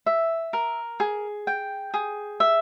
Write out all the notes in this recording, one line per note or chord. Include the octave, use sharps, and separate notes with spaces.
E5
A#4
G#4
G5
G#4
E5